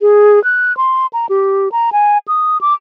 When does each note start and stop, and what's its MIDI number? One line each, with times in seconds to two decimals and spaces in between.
0.01 0.42 68
0.44 0.76 90
0.77 1.06 84
1.13 1.26 82
1.29 1.69 67
1.72 1.90 82
1.92 2.18 80
2.28 2.58 87
2.61 2.74 86